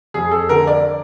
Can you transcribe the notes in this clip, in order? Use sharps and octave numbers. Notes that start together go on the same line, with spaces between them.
F2 G#4
A4
D3 A#4
D5